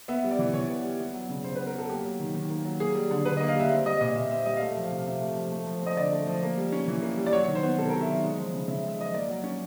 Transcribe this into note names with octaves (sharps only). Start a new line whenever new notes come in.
B3 E5
G3
D5
E3
E3 C#5
B3
G3
B3
F#3
C#3
C#3 C5
B4
B3
A#4
F#3 A4
A#3 G4
F#3
D#3
D#3
A#3
F#3
A#3 G#4
G3
D3
D3 B4
D#5
A#3
F5
G3 E5
C4
G3 D#5
A#2 D#5
A#2 E5
C4 E5
G3 D#5
F5
A3 E5
F3
F5
C3
F5
C3 E5
A3
F3
A3
F3
C4 D#5
D3 D5
A3
F3
A#3
G3
C#4
E3
A#3
G3
D5
F#3 C#5
C#5
D#3
C5
B3
C3 A4
A#4
F#3
E5
D#3
G#3
F3
C#3
C#3 E5
G#3 E5
F3 D#5
A#3 D5
F#3
C#4